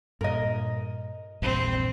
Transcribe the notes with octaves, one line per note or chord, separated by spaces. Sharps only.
G2 A#2 A#4 D#5
A#1 E2 G2 C4